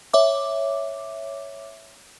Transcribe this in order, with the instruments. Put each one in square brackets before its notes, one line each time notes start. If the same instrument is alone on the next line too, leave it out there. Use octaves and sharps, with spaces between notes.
[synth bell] C#5 E5 D6